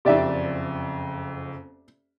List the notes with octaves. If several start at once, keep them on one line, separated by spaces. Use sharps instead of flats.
F#1 F2 G4 D5 E5